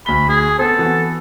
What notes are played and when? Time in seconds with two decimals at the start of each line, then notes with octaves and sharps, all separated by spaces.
0.06 D2 B5 G7
0.29 G#4
0.58 B3 C4 A4 C5
0.79 E3 B3 F#4